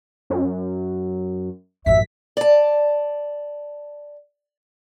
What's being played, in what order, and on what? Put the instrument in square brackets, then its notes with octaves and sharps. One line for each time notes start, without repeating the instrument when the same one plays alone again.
[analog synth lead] F#2
[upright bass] A1 F#2 [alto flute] E5 [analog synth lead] B6
[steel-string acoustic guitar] D5 A5